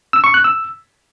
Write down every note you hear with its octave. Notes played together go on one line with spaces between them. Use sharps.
E6
C#6
F#6
E6